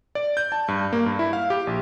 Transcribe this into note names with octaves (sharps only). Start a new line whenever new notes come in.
D5
G6
A5
G2
A#3
G2
E4
F5
G4
A#1